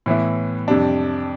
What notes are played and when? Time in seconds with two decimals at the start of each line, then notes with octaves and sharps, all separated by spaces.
0.06 A2 E3 B3 E4
0.68 F2 C3 G3 D4